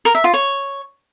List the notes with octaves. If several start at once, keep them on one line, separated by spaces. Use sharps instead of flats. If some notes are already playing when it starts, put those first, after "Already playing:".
A#4
E5
F4
C#5